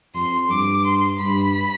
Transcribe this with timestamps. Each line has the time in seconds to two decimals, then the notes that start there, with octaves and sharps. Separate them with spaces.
0.15 F2 C6
0.49 G2 D6
0.85 C6
1.20 G2 B5